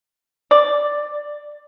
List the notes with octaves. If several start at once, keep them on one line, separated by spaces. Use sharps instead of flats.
D5